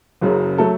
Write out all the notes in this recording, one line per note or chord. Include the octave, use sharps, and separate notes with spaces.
F#1 F#2 C#3 F#3
F#3 A3 A4